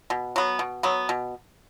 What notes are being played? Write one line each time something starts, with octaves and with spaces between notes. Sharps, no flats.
B2
F#3 B3
B2
F#3 B3
B2